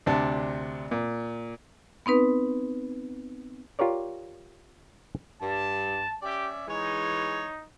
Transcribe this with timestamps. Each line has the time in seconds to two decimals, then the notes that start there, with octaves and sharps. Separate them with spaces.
0.06 D2 C3 D4 A5
0.91 A#2
2.06 B3 C4 D#4 B4
3.79 F4 G4 A#4 C#5 D5
5.41 G2 A5
6.22 C#4 G4 D5 E5
6.68 E3 G#3 D#4 C#5